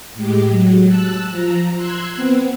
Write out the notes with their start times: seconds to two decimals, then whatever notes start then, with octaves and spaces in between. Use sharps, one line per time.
0.14 A2 G#3 G4
0.49 F#3
0.87 A5 E6 F#6
1.30 F3 A#5
1.75 C6 E6 F#6 G#6
2.16 B3 C4